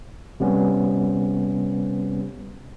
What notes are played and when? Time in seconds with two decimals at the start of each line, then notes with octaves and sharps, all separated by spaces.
0.40 C3 G3 B3 C#4